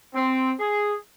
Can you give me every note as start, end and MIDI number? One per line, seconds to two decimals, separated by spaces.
0.14 0.51 60
0.60 0.94 68